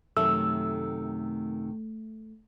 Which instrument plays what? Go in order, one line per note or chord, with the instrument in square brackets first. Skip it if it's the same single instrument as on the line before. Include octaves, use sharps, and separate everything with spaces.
[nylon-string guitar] F#2 C3 D#3 [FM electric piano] A3 [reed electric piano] E6